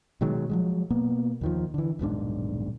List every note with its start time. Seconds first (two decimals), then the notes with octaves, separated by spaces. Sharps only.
0.21 B2 D#3 F#3 G#3
0.49 F3 F#3 G#3
0.90 B2 A#3 B3
1.41 D#2 D#3 F3
1.74 D3 E3
1.99 D#1 B1 G#2 D4